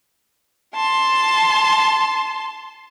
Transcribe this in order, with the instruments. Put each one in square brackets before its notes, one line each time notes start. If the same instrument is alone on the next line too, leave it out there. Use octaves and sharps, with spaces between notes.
[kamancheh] A5 C6